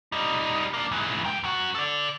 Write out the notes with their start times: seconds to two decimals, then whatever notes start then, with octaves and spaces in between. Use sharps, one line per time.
0.12 G3 D#4
0.74 A#3 D4
0.92 G#2 E3
1.24 G2 G5
1.43 F#2 F#4
1.75 A4 D5